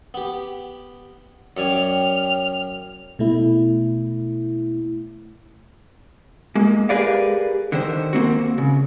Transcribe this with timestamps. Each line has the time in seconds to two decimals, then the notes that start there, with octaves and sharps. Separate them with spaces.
0.14 B3 G4
1.57 F#2 C#5 D5 G5 G#5 F6
3.19 B2 A3 E4
6.55 G#3 A#3
6.89 G4 G#4 A#4 B4 D5 F5
7.72 D3 D#3 C5
8.13 A#3 C4 F#4
8.58 C#3